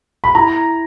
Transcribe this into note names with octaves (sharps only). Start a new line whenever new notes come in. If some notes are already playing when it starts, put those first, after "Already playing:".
B5
E4 A#5